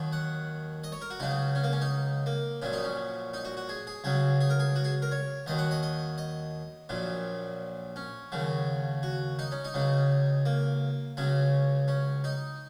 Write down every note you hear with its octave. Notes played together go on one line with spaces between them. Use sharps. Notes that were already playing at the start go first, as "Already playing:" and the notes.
Already playing: D#2 D#3 F#3
F#5
D#5
C#5
A#4
F#4
C#2 C#3 F#3 D#4
C#4
A#3
C#4
D#4
A#3
A#1 A#2 F#3 C#4
D#4
C#4
D#4
F#4
F#4
G#4
G#4
C#2 C#3 F#3 G#4
G#4
A#4
G#4
F#4
G#4
A#4
C#5
D#2 D#3 F#3 D#5
F#5
D#5
D#5
D#5
A#1 A#2 F#3
C#4
D#2 C#3 F#3
F#4
D#4
C#4
D#4
C#2 C#3 F#3
A#3
C#2 C#3 F#3 C#4
C#4
D#4